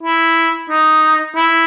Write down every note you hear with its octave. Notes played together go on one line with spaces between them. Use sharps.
E4
D#4
E4